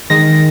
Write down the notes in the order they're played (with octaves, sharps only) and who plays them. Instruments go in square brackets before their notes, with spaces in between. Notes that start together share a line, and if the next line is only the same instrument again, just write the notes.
[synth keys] D#3 G#3 A#6